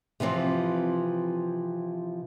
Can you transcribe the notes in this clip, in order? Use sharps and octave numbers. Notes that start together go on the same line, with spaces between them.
C3 E3 F3 C4